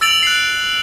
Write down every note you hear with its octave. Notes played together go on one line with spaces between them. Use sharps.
E6 A6 D7 F7 F#7
F#6 C7